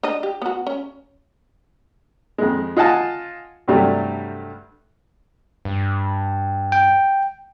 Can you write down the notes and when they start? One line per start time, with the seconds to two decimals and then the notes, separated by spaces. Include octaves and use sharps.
0.03 D4 D#5
0.23 G4
0.42 B3 F#4
0.67 C#4
2.38 F2 G#3
2.77 F4 D#5 F#5 G#5 A5
3.68 G2 C3 F#3 G3 A3
5.65 G2
6.72 G5